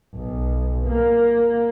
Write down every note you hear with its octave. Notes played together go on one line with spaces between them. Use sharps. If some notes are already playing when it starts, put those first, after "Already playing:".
B1
A#3